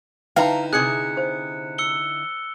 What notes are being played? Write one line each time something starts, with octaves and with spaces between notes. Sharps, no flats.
D3 D#4 E4 B4 E5 F5 G5 A#5
C3 G#4 F#6 C#7
C5
E6 C#7 G7